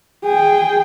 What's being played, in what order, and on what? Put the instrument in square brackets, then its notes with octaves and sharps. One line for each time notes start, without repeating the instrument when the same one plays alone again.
[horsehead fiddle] G#4 G5